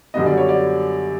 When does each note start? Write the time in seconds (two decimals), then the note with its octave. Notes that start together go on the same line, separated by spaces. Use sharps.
0.14 F#2 D3 G3 B3 D#5
0.26 D5
0.37 C#5
0.49 D5